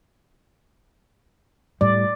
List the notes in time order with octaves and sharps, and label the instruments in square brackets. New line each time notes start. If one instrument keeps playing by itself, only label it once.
[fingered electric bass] A2 G3 [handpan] D5